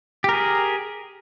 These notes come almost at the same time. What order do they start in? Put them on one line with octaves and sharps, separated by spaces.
G4 A#4 G#4